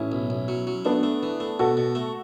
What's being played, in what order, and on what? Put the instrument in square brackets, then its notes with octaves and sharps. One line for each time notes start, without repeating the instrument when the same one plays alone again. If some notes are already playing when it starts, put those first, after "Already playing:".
Already playing: [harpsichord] A1 [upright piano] C#4 E4
[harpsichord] B1
B1
F#3
F#3
[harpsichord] A3 [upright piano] B3 D4
[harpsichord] A3
E3
A3
[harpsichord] B2 [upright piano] F#4 A4
[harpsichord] B2
A3